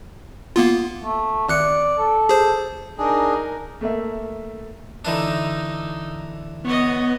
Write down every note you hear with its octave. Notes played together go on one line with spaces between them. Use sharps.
A#3 B3 F4
A3
G#1 D5 F#6 C#7
A4
G#4 C5
D4 D#4 G#4 A#4
A3 A#3 E5
D3 E3 D4 D#4
B3 C#5 D#5